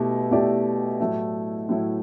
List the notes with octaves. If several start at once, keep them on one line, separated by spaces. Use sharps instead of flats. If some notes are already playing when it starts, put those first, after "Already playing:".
Already playing: B2 A3 E4 G4
B2 A3 E4 G4 D5
A2 F#3 A3 E4
A2 F#3 A3 E4